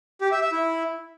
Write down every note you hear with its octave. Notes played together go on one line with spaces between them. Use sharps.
G4
E5
E5
E4